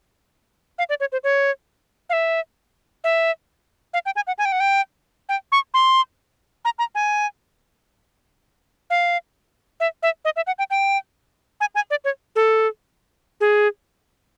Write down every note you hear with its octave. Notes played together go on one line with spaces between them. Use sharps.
F5
D5
C#5
C5
C#5
F5
E5
E5
F5
G5
G#5
F#5
G#5
G5
F#5
G5
G5
C#6
C6
A#5
A#5
G#5
F5
E5
E5
D#5
E5
F#5
G5
G5
G#5
G#5
D5
C#5
A4
G#4